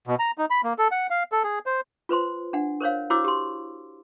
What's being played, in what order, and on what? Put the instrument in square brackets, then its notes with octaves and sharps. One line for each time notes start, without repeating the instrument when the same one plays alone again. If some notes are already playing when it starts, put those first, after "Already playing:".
[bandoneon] B2
A#5
D#4
B5
A#3
A4
F#5
F5
A4
G#4
C5
[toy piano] F4 B4 C5 C6
D4 F#5
A#4 C5 C#5 F5
E4 F#4 C5 C#5 D6 E6
G4 C6